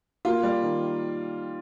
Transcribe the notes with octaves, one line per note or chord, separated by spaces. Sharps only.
A#3 F4
G3
D#3